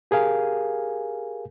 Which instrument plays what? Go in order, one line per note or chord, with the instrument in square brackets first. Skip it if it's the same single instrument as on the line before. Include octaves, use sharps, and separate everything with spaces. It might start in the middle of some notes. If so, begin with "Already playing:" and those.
[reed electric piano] G4 G#4 A#4 F5 G#5